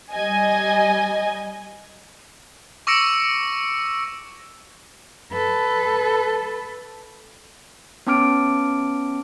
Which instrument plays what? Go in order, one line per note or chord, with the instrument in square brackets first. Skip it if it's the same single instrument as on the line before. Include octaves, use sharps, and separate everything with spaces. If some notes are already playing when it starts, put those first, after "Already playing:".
[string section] G3 D#5 G#5
[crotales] C#6 D6 E6 A#6 C#7 D7
[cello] A4 B4
[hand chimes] B3 C#4 A5 D6 F6 D7